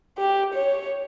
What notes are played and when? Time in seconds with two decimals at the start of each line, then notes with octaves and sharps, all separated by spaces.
0.18 G4
0.54 C#5